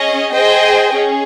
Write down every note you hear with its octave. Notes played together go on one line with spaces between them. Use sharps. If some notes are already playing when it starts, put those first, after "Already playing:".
Already playing: C#4 G#4 D#5
G#4 C5 D#5 G5
C#4 G#4